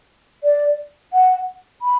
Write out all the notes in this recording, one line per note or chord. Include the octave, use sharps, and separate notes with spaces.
D5
F#5
B5